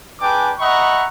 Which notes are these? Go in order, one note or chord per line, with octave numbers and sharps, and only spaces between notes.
D4 G#4 B4 G5 G#5 D6
D#5 E5 F#5 A#5 B5 C#6